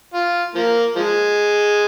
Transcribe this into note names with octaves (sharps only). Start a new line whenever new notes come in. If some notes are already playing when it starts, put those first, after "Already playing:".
F4
F3 A#3
F3 G#3